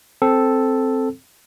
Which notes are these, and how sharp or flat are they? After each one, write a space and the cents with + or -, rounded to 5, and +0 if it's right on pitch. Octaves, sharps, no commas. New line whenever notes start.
C4 +0 A4 +0